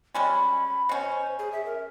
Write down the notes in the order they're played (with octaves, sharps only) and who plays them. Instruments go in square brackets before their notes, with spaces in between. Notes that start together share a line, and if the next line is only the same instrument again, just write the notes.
[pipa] G3 G#3 C#4 [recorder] B5
[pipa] B2 C#4 [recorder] C5
[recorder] G#4
E5
A#4